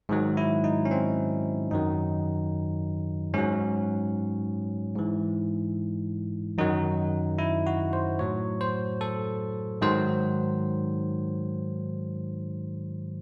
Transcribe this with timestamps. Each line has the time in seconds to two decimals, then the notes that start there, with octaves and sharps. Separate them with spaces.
0.09 G#2 D#3 F#3
0.37 E4
0.64 D#4
0.85 C#4
0.91 C4
1.71 F#2 D#3 F#3 D#4
3.34 G#2 F#3 C#4
4.95 G#2 E3
6.58 F#2 D#3 F#3 D#4
7.38 E4
7.67 F#4
7.93 C5
8.19 A2 F#3 C#5
8.61 C5
9.01 A4
9.81 G#2 D#3 F#3 C5